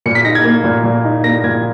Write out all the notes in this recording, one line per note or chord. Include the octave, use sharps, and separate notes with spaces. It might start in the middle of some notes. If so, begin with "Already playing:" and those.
A#2 C#7
B6
D#4 A#6
G#6
A#3
A#2
A#2
D#4
A#3 A#6
A#2 G#6